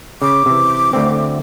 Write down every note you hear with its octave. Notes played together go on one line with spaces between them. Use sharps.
C#3 D6
C3 E3
D2 A3 C4